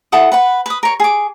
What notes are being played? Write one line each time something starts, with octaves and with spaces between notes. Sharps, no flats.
E4 A4 F#5 D#6
B4 F#5 B5
B4 D#6
A#4 C#5
G#4 D6